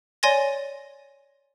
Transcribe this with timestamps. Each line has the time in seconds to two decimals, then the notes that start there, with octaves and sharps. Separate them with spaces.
0.23 C#5 D5 G#5 C6 A6 A#6